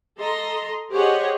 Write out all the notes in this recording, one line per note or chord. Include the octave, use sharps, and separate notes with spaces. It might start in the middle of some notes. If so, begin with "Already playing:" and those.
A4 D#5 A#5 C6
G4 G#4 C5 C#5 D#5 F#5